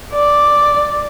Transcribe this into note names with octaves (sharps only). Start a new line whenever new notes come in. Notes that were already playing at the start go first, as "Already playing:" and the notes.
D5